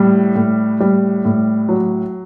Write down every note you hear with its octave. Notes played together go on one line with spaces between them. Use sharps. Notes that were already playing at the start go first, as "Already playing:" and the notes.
Already playing: A2 G3
A2
G3
A2
F#3